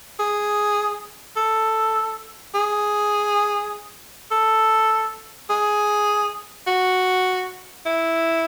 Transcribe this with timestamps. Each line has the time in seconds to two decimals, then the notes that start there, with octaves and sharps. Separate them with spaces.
0.19 G#4
1.36 A4
2.54 G#4
4.31 A4
5.50 G#4
6.67 F#4
7.86 E4